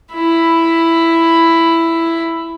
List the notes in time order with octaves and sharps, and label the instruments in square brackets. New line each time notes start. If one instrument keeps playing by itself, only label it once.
[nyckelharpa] E4 B5